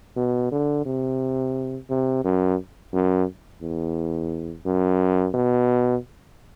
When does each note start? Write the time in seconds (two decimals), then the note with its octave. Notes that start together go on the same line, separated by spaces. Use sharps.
0.16 B2
0.51 D3
0.85 C3
1.89 C3
2.24 F#2
2.93 F#2
3.62 E2
4.66 F#2
5.34 B2